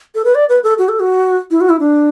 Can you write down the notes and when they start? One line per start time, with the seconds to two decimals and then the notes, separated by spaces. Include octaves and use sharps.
0.15 A4
0.25 B4
0.35 D5
0.49 B4
0.64 A4
0.78 F#4
0.89 A4
1.00 F#4
1.51 E4
1.61 F#4
1.69 E4
1.80 D4